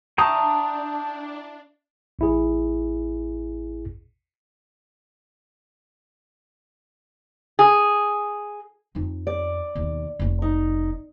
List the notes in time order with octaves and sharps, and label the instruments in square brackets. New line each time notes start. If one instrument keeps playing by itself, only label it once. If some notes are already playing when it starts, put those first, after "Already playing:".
[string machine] D4 [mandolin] E4 A5 C#6 [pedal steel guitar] G5 A#5 D#6
[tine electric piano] A1 E4 G#4
[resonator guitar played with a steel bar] G#4
[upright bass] F2 D#4
[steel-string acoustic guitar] D5
[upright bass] D#2 B2
F1 C#4
[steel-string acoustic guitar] D#4